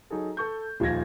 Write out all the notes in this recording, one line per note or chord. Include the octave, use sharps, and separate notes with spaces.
F#3 D#4 G#4 A4
A4 C#6 G6
D#1 F3 D#4 F4 G#6 A#6